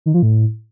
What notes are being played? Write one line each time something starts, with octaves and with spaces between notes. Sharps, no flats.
D#3
F3
A2